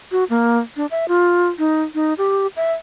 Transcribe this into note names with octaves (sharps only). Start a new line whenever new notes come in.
F#4
A#3
D4
E5
F4
D#4
D#4
G4
E5